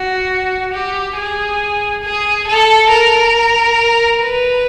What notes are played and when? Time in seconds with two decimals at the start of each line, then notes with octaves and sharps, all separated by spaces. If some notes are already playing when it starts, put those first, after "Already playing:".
Already playing: F#4
0.74 G4
1.17 G#4
2.03 G#4
2.47 A4
2.90 A#4
4.21 B4